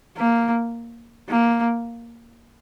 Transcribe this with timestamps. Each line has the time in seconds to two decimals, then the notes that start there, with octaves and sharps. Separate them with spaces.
0.17 A#3
1.29 A#3